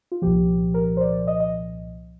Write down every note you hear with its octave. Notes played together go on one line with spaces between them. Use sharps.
F4
C2 A#2 F3 G4
A#4
C5
D5
D#5
D#5